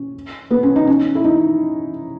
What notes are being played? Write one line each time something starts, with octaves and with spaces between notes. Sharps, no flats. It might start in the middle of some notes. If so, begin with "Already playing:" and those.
Already playing: C#4
B3
C#4
D#4
C#4
E4
D#4